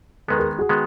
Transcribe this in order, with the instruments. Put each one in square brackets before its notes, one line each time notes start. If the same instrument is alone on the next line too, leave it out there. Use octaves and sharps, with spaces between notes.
[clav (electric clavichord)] D#3 G#3 B3 [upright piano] A4 B4
[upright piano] G#4 A#4
F#4 G#4
[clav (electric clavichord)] D#3 G#3 B3